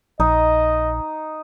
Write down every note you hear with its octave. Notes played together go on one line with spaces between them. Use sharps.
A#1 D#4 D#5